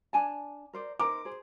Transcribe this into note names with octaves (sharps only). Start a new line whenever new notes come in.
D4 G#5 A5
A#4 C5 D5
D#4 A#4 C5 D6
G#4 C5